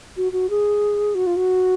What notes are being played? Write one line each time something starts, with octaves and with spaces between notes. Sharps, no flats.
F#4
F#4
G#4
F#4
F4
F#4